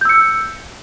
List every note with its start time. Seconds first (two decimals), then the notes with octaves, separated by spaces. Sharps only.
0.01 G6
0.05 E6
0.09 C#7